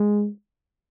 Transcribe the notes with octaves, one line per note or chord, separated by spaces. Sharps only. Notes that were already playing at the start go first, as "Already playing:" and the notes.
Already playing: G#3